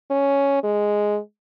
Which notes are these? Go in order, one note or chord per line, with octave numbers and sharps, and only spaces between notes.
C#4
G#3